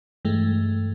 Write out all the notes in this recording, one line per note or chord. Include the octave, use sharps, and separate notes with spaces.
G2 E3 G#3 A3